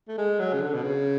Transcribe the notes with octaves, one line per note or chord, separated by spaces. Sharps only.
A3
G#3
F#3
C#3
D3
B2
C#3